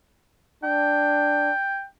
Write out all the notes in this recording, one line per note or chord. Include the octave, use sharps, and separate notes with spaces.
D4 G5